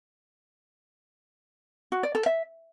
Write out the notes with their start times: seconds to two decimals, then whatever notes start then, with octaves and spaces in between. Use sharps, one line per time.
1.92 F#4
2.03 D5
2.15 A4
2.26 E5